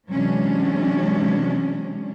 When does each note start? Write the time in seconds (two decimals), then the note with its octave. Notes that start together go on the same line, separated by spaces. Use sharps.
0.12 C3 E3 F#3 G#3 C#4 D4